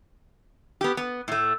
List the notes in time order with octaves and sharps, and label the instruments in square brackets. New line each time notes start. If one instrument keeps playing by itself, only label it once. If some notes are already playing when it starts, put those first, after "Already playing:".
[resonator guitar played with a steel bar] B3 G4
B3
A2 A3